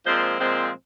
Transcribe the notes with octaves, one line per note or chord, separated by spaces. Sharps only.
A#2 F3 G#3 C4 C5
A#2 F3 G#3 C4